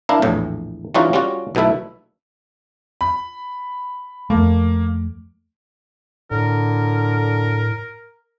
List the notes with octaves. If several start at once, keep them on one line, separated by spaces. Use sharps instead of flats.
D4 E4 A#4 F5
A#1 E2 A2
E3 G3 C#4 D#4 F4 F#4
G3 C#4 F4 F#4
B1 B2 A3 E4 E5
B5
F2 A3 A#3
A2 D3 A#4